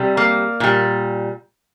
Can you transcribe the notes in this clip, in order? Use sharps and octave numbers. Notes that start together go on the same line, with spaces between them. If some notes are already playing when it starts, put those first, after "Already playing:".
Already playing: C3 G3
A#3
A#2 G3